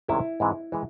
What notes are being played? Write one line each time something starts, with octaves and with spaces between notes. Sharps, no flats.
C2 C3 D#3 G#3 C#4 E4
G#2 E3 G#3 C4
E3 G#3